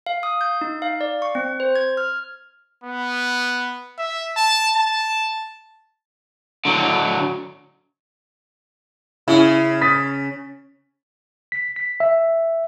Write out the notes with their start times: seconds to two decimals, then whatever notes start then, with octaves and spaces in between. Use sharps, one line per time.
0.06 F5
0.23 D#6
0.41 G6
0.61 D#4
0.82 F5
1.01 D5
1.22 C#6
1.35 C4
1.60 C5
1.76 G#6
1.97 F6
2.84 B3
3.98 E5
4.37 A5
4.76 A5
6.65 D3 F#3
9.28 C#3 E4
9.81 D#6 A6 B6
11.52 B6
11.76 B6
12.00 E5